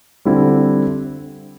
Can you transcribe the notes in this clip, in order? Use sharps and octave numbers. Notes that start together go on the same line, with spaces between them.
D3 G3 C4 E4